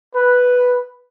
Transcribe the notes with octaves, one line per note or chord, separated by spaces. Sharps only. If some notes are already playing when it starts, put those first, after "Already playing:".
B4